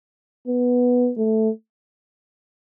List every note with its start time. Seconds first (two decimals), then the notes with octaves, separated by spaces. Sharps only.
0.48 B3
1.18 A3